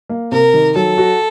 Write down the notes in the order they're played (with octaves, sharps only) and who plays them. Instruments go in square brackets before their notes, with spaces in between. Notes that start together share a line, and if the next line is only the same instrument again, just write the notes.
[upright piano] A#3
[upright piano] C3 [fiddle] A#4
[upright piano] D#3
[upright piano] F#3 [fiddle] A4
[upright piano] F#4